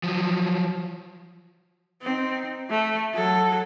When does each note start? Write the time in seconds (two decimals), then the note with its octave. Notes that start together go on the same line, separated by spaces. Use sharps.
0.03 F3 F#3
2.02 C4 D#4
2.70 A3
3.15 F#3 A4